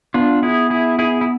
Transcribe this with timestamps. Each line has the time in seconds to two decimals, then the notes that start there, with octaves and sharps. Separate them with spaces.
0.14 B3 D4 F4
0.43 E4 G#4
0.70 E4 G#4
0.99 E4 G#4
1.21 E4